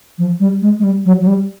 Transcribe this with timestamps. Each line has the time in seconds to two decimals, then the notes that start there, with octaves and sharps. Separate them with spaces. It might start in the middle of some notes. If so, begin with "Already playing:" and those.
0.18 F3
0.40 G3
0.62 G#3
0.79 G#3
0.83 G3
1.06 F#3
1.21 F#3
1.27 G3